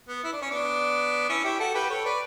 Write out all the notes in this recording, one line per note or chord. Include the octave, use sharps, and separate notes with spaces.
B3
E4
D4
C#4
B3 D4
C#4 E4
E4 G4
F#4 A4
G4 B4
A4 C#5
B4 D5